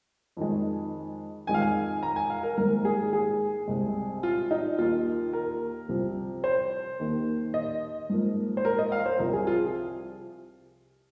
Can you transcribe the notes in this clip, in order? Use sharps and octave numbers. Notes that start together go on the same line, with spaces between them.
F2 D#3 G#3
F2 D#3 G#3 G#5
F5
G#5
A#5
G#5
F5
A#4
G#2 D#3 A#3 A#4
G#4
G#4
C2 C3 G#3
F4
D#4
D#2 D#3 A#3 F4
A#4
C2 C3 F3
C5
D#2 D#3 A#3
D#5
G#2 F3 A#3
C5
A#4
D#5
F5
C5
C2 C3 F3 A#4
G#4
F4